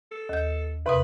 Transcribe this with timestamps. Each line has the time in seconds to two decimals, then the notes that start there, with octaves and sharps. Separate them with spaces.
0.12 A4
0.29 D#2 G6
0.86 E2 C3 B4 D#6